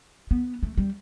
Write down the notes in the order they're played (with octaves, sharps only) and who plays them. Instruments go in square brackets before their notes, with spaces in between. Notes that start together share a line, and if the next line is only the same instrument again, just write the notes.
[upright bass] B3
A3
G3